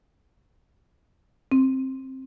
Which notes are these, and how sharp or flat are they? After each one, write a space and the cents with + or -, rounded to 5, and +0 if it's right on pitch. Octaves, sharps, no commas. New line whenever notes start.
C4 +15